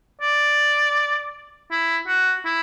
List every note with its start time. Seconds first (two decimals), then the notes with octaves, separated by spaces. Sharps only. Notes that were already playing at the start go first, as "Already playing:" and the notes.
0.21 D5
1.71 E4
2.07 F#4
2.45 E4